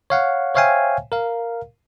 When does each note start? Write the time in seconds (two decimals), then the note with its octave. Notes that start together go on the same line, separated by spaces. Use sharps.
0.10 C#5 F5 F#5
0.55 C5 C#5 E5 F5 G5 G#5
1.12 A#4 F5